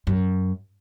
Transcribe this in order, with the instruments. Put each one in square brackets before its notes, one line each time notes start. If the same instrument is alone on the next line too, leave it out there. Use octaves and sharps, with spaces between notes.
[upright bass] F#2